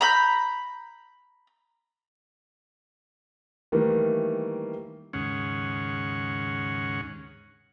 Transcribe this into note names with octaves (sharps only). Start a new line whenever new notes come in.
A#5 B5 G6
D#3 E3 G3 A3 A#3
D#2 G#2 C#3 C#4 F#5